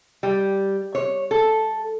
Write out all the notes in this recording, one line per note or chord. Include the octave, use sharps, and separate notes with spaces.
G3
C#5
A4